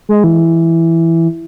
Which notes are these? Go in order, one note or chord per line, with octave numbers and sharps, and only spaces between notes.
G#3
E3